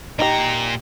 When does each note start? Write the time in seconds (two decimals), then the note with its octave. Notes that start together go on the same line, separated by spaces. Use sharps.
0.19 A#2 D#4 G4 A#5